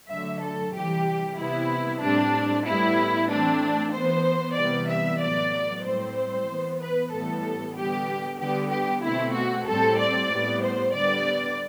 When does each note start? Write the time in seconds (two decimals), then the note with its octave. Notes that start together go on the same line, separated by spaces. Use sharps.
0.11 D3 F#3 A3 E5
0.43 A4
0.75 C3 E3 G3 G4
1.39 C3 G3 B3 E4
2.02 A2 G3 C4 D4
2.66 A2 G3 B3 E4
3.30 E3 A3 C4 D4
3.94 E3 B3 C5
4.57 C3 E3 G3 B3 D5
4.89 E5
5.21 A2 F#3 B3 D5
5.85 A2 G3 C4 C5
6.48 E3 B3
6.81 B4
7.12 A2 E3 G3 B3 A4
7.76 D3 G3 B3 G4
8.41 D3 G3 B3 G4
8.71 G4
9.04 B2 A3 C4 E4
9.35 F#4
9.68 A2 G3 C4 A4
9.99 D5
10.31 A2 G3 B3
10.64 C5
10.95 D3 G3 B3 D5